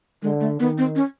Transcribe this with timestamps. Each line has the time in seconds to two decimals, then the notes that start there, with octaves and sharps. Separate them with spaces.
0.22 D3 G#3
0.40 A3
0.60 D#3 B3
0.78 C4
0.96 C#4